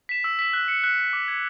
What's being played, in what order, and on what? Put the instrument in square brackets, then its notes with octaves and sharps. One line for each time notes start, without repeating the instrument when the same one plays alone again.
[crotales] B6 E7
E6
B6 E7
F#6
C#7 E7
F#6
C#7 E7
D6
G#6 C#7